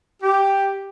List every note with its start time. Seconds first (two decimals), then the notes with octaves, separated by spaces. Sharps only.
0.23 G4